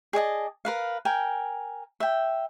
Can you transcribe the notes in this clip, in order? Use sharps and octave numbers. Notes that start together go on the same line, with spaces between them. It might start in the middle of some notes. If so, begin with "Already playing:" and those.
G#4 D5 D#5 A5
A#4 B4 F5
A#4 G5 G#5
E5 G5